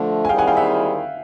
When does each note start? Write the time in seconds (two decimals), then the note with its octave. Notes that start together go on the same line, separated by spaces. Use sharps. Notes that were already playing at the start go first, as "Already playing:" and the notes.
Already playing: D3 F3 A3
0.25 G#5
0.29 D#3 G3 C4 E4 G#4 F5 G5
0.38 F#5 G#5
0.47 F5 G5
0.57 E5 F#5